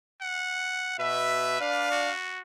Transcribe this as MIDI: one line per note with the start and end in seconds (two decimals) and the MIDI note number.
0.21 0.96 78
0.99 1.58 47
0.99 1.88 71
0.99 1.58 76
1.60 2.12 62
1.60 2.12 74
1.60 2.12 77
1.91 2.41 66